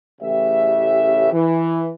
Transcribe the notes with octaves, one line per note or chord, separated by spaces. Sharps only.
A1 C#3 G4 E5
E3